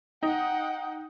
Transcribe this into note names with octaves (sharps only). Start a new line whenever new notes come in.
D#4 F#5 G5